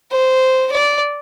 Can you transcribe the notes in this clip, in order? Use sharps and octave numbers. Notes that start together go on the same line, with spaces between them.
C5
D5